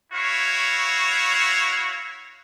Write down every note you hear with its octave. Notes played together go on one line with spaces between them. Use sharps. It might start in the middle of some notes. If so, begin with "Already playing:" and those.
E4 F#4 C#5 F5